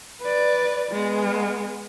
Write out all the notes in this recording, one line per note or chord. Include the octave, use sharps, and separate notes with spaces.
B4 D5
G#3 B3